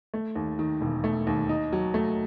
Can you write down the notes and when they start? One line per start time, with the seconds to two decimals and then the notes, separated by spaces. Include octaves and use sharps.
0.14 A3
0.36 D#2
0.59 D#3
0.81 E1
1.04 A3
1.27 D#2
1.49 D#4
1.73 F#3
1.94 A3